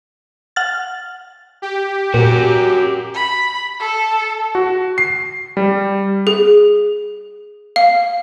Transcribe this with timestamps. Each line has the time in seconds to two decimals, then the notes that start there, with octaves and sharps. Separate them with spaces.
0.56 F#5 F6 A6
1.62 G4
2.14 A#2 F#4 A#4
3.14 B5
3.80 A4
4.55 F#4
4.98 C7
5.57 G3
6.27 G#4
7.76 F5